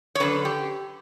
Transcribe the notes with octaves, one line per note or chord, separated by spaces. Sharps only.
C#5
F#2 D3 B4
G4